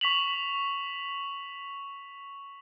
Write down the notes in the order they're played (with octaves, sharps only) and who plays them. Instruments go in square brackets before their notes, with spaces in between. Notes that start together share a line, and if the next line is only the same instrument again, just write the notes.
[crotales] C#6 B6 F7 F#7